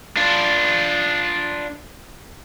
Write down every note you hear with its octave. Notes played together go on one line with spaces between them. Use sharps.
D4 F4